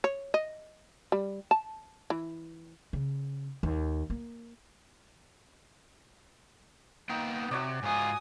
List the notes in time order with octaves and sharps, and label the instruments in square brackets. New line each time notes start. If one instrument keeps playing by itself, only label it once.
[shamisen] C#5
D#5
G3
A5
E3
[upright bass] C#3
D#2
A#3
[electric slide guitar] A#3 B3 G5 [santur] D#4
[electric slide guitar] C3 [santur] F#4 C#5 D5
[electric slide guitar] G#2 F4 [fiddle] G#5 D#6